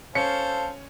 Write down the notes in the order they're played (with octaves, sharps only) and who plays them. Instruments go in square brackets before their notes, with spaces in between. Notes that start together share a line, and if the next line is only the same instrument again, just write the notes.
[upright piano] C#4 C#7 [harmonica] A4 C5 F5